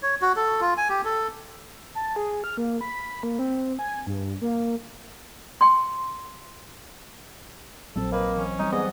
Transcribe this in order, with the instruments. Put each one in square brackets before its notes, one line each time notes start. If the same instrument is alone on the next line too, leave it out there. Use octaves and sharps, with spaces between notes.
[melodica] C#5
F#4
A4
F4
G#5
G4
A4
[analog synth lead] A5
G#4
F6
A#3
B5
B5
A#3
C4
G#5
G2
A#3
[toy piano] G5 C6
[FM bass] A#1 [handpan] F#3 C4 [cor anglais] A4
[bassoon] A#3 [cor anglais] B4 [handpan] D#5
[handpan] E3 [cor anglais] C#4
[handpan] G3 C4 [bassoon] D#4
[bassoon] G#2 [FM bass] B3 [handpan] G4 D5 F#5 [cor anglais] D#5